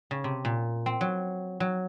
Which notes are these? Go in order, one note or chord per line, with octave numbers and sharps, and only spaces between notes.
C#3
C3
A#2
C4
F#3
F#3